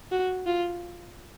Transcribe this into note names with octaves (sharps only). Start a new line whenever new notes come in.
F#4
F4